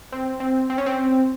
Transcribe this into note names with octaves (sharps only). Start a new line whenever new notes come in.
C4
C4
C4
C#4
C4